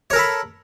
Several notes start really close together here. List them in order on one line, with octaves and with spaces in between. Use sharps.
C#5 A#4 A4 B5